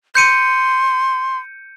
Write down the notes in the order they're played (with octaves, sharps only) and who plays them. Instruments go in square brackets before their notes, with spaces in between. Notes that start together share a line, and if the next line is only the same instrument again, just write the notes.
[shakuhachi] C6 [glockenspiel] G6 C#7 D#7